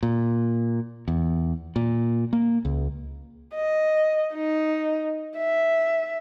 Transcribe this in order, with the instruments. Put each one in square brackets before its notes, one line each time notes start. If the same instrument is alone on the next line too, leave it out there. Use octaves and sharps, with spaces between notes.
[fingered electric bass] A#2
E2
A#2
A#3
C#2
[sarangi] D#5
D#4
E5